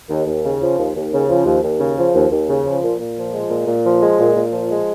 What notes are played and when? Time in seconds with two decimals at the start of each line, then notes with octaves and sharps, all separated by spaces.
0.09 D#2
0.27 D#2
0.44 C#3
0.61 F3
0.78 D#2
0.95 D#2
1.13 C#3
1.29 F3
1.46 D#2
1.63 D#2
1.80 C#3
1.98 F3
2.14 D#2
2.31 D#2
2.49 C#3
2.65 F3
2.83 A#2
3.00 A#2
3.17 F3
3.33 G#3
3.50 A#2
3.67 A#2
3.84 F3
4.02 G#3
4.19 A#2
4.36 A#2
4.53 F3
4.70 G#3